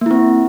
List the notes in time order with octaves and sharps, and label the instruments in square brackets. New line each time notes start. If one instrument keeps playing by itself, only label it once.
[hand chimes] A#3
E4
C4